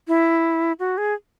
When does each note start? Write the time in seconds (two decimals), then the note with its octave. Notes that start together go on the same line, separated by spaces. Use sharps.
0.08 E4
0.80 F#4
0.98 G#4